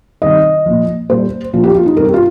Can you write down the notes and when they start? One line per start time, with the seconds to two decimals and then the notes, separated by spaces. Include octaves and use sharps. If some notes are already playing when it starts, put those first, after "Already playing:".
0.22 C3 D#3 G3 D#5
0.66 A#2 F3
1.09 A#2 G3 C5
1.53 A#2 F3 F4
1.63 G4
1.75 F4
1.86 D#4
1.97 C3 G3 A#4
2.05 G4
2.14 F4